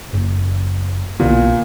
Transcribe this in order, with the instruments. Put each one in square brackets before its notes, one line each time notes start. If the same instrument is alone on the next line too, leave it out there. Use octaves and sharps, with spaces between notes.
[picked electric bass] F#1
[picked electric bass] B1 D3 B3 [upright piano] A#2